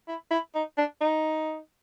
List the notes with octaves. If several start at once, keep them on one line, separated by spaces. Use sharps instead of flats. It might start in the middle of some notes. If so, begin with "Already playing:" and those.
E4
E4
D#4
D4
D#4